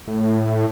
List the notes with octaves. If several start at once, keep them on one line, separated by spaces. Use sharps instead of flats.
A2